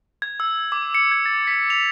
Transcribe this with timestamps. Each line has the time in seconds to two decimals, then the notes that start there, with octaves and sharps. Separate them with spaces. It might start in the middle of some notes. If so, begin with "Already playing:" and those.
0.22 G#6
0.40 E6
0.72 D6
0.94 C#7
1.12 G#6
1.26 A6
1.47 B6
1.70 F7